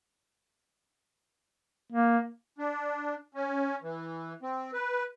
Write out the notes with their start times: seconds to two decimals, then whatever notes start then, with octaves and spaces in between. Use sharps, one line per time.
1.93 A#3
2.58 D4
3.35 C#4
3.82 E3
4.43 C4
4.73 B4